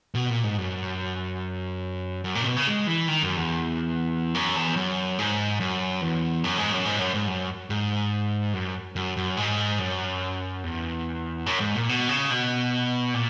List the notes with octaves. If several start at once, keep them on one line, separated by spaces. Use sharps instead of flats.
B2
A#2
G#2
F#2
F#2
A#2
C#3
B2
C#3
G#3
E3
D#3
F#2
E2
F#2
E2
F#2
G#2
F#2
E2
F#2
G#2
F#2
G#2
F#2
G#2
F#2
G#2
F#2
F#2
F#2
G#2
F#2
E2
F#2
G#2
A#2
B2
C#3
B2
A#2